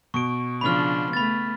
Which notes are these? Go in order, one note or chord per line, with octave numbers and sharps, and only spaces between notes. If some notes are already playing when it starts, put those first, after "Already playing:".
B2 C#6 D7
C#3 F3 D4 B5 F6
A3 B3 B5 A6